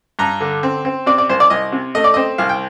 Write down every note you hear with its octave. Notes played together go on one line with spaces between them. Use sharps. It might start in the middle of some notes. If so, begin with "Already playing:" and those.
G2 A#5
D3
C4
C4
C3 D5
D5
C2 C5
D5
C2 D#5
C3
A3 D#5
D5
D#5
C4
C2 F5
G5